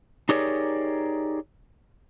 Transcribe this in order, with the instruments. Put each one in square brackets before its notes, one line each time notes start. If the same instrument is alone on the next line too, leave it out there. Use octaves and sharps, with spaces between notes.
[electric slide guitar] D#4 G4 G#4 A#4 C#5 D5